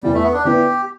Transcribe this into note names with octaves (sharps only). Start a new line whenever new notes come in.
E2 E3 G3 B3
A3
B3
D4
D3 B3 E4 G4 B4 D5